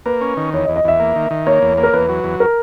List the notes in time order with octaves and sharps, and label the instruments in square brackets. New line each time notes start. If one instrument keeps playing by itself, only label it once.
[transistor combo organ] A#3 [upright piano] B4
[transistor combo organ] C#4
D#3
[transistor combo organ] E2 [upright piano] C#5
[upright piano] D#5
[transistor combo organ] E2
[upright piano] D#5
[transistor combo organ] E2 [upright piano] E5
[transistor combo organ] A#3
D#3
D#3
[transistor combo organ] A#3 [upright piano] C#5
[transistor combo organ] E2
A#3
[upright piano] A#4
[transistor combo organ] E2 [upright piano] B4
[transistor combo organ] F#3
E2
[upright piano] A#4